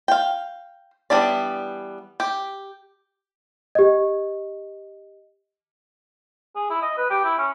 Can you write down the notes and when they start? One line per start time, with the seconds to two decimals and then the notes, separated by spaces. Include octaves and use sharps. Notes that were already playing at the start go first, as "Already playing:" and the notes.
0.08 F5 G5
1.10 E3 G3 B3 D4 D5
2.20 G4
3.75 G4 D#5
6.56 G#4
6.70 E4
6.82 D#5
6.97 B4
7.10 G4
7.25 E4
7.38 C#4